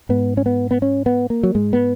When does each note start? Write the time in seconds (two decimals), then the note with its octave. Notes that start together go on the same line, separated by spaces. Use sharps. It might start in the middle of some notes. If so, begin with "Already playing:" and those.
0.09 G#2 B3
0.37 C#4
0.46 B3
0.71 B3
0.82 C#4
1.06 B3
1.30 A#3
1.43 F#3
1.55 G#2 G#3
1.73 B3